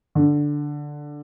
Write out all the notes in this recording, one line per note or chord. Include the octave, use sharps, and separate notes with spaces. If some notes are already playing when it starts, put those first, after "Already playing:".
D3